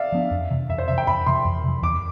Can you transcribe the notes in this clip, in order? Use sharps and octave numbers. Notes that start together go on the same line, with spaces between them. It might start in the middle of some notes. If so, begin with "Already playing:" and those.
Already playing: D5 E5 F5
F3 B3 D4
F2
C3 E3
F2 E5
C5
C3 E3 E5
G5
F2 B5
C3 E3 C6
F2
C3 E3
E2 D6